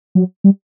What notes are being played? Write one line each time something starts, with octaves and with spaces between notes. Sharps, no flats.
F#3
G3